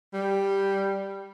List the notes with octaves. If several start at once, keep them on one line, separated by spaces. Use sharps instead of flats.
G3